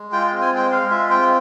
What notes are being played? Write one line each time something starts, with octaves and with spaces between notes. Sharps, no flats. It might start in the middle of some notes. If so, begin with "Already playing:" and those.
Already playing: G#3
F4 G5
C4 G5
G#5
G#3 G5
G#3 F5
F4 E5
C4 G5